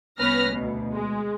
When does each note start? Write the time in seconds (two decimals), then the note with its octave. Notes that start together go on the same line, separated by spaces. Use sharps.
0.19 C2 B3 C#4 B4 F6 A#6
0.52 D2 B2
0.93 G#3